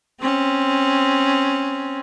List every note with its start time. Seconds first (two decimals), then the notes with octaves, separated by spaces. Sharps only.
0.21 C4 C#4